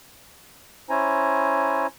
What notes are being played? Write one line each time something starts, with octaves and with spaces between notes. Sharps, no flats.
C#4 E4 C5 G#5 A#5